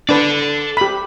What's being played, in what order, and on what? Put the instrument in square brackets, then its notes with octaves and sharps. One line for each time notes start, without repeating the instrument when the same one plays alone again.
[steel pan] D4 B4 [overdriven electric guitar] A4 D5
[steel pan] G4 B5